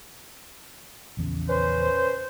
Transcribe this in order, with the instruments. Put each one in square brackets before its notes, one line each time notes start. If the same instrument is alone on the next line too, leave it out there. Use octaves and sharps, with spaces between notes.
[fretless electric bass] A#1 E2 C#3
[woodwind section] C#4 B4 C5